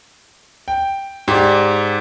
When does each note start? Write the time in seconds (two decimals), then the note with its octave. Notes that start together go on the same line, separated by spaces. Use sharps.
0.68 G5
1.28 G#2 G4 D5